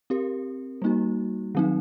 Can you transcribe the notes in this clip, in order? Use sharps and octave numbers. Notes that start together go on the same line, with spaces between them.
C4 G4 A#4
G3 A#3 D#4 F#4
D#3 F#3 C4 D#4